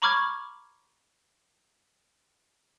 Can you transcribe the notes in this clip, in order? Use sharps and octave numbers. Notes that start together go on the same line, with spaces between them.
A#5 B5 C#6 D6 F6 G#6